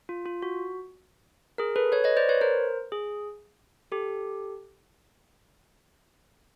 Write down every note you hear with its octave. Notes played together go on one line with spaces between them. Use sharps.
F4
F4
F#4
G#4 A#4
A4 B4
B4 C#5
C#5 D#5
C5 D5
B4 C#5
A#4 C5
G#4
G4 A4